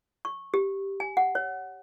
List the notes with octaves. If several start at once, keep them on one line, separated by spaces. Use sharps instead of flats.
C#6
G4
G#5
F#5
C#5